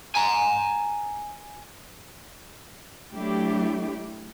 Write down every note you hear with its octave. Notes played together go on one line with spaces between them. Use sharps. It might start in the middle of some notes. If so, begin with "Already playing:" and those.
G#5 A#5
F#3 A3 D4 E4 G4